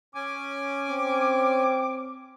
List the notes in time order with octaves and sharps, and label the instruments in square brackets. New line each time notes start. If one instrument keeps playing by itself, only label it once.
[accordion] C#4 G#5 [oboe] D6
[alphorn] C4